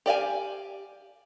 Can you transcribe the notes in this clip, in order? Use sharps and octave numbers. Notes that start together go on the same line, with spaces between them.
G4 D5 F5 G#5